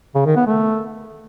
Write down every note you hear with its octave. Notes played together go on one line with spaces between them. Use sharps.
C#3
D#3
B3
A3